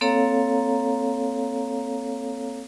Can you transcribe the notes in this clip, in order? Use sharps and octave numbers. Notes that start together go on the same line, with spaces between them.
A#3 C4 A4 C#5 F5 A#5